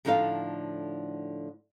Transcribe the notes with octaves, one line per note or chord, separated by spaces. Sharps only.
A2 D3 F3 D#4 A4 F5